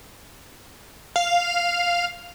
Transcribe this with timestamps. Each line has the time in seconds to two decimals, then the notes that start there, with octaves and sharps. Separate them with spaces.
1.16 F5